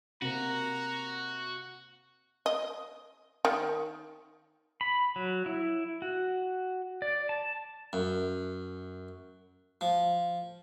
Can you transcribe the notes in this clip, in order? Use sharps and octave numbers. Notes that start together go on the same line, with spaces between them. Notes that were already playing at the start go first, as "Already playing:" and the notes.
C3 A#3 F#4 A#5
D#5
D#3
B5
F#3
E4
F#4
D5
A5
F#2
F3